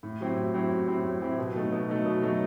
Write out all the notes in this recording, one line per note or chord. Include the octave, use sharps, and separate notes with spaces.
A2
F#3 C4 E4 G4
A2
F#3 C4 E4 G4
A2
F#3 C4 E4 G4
A2
F#3 C4 E4 G4
B2
F#3 A3 D#4
B2
F#3 A3 D#4
B2
F#3 A3 D#4